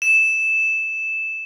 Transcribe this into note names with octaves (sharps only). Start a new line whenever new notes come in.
E7